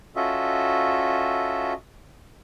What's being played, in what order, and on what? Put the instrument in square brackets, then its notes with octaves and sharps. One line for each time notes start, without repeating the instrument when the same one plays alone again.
[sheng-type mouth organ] C#4 F4 F#4 A4 D#5 E5